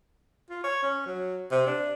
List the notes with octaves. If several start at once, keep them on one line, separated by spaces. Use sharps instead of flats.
F4
C#5
C#4
F#3
C3
D4